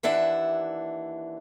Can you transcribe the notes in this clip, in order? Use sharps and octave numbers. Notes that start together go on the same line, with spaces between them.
D#2 E3 D4 E5 F#5